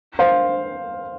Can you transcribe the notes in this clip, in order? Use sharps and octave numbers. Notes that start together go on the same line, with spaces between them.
C5 F5